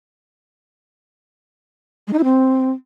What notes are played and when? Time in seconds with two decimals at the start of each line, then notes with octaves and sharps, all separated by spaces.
2.07 G#3
2.13 D#4
2.18 E4
2.24 C4